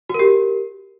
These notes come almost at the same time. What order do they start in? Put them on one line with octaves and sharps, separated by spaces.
F#4 A#4 G4